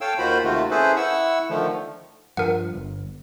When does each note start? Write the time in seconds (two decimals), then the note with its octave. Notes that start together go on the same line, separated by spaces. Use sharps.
0.01 A4 C#5 F5 G5 E6
0.19 D#2 D#3 F4 F#4 C5 B5
0.44 D#2 C3 D#3 A3 F4 F#4
0.71 C#4 E4 G#4 A4 B4 C5
0.96 E4 F#5 C#6 E6
1.50 D3 D#3 F3 A3
2.37 G2 F3 A#4 F#5
2.74 G1